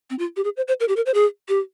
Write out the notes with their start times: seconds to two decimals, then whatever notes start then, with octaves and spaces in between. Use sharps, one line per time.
0.10 C4
0.19 F4
0.36 G4
0.44 G#4
0.56 C5
0.68 C5
0.80 A#4
0.88 G4
0.96 A#4
1.06 C5
1.14 G#4
1.49 G4